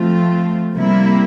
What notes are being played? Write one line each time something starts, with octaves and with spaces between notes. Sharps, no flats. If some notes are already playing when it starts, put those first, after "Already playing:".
Already playing: F3 A3 C4 F4
C3 G3 A#3 E4